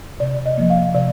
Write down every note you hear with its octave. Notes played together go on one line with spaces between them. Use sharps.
C3 D5
D#5
F3 A#3
F5
C3 D5